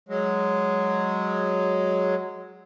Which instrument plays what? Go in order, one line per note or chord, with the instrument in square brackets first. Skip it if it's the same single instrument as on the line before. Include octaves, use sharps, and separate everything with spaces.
[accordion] F#3 G#3